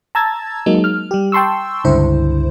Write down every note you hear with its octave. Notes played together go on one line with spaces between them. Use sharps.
A5 A#5 E6 G#6 A6
F#3 G#3 A#3 D#4
F6
G3 G4
G5 A5 C6 C#6 E6
C#2 G2 D3 E4 C5